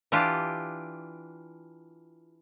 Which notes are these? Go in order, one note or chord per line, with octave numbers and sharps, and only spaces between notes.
E3 D4 F4 G4